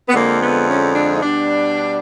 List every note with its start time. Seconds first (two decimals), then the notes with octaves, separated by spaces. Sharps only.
0.09 B3
0.14 F2 D3 F3 G#3 A#3
0.41 B3
0.68 C#4
0.95 D4
1.15 D#4
1.21 B2 G3 D4